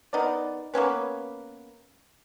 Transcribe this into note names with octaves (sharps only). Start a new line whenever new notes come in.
B3 D#4 A#4 D5
A#3 B3 C#4 B4